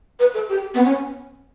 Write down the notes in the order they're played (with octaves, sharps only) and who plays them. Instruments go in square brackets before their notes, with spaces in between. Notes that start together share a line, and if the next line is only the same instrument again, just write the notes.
[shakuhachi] B4
A4
G4
B3
C#4